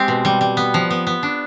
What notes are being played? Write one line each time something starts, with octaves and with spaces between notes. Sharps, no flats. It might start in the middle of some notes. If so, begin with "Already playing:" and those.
Already playing: G#3 C4 G4
B2
G3
G3
B3
F3
B3
B3
D4